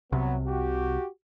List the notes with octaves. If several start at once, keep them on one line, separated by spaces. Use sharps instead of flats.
C2 C3 F#3 B3
F#4 G4